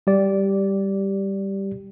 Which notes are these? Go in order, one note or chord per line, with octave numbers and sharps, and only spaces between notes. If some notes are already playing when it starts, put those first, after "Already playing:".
G3 G4 D5